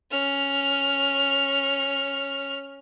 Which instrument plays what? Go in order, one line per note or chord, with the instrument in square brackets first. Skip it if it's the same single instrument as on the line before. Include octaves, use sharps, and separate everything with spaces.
[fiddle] C#4 F6